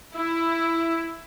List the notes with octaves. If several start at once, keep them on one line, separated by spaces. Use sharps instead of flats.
E4